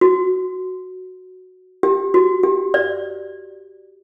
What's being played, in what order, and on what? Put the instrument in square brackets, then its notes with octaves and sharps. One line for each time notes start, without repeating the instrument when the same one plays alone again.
[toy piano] F#4
G4
F#4
G4
D5